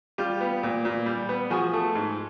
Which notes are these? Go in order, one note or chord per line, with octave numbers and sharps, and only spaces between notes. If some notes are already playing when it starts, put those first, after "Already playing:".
G3 F4 G4
B3
A#2
A#2
G3
B3
F3 F#4 G#4
A3
G#2